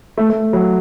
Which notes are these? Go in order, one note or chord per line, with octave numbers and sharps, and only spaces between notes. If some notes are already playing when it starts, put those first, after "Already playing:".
A3
A3
F#3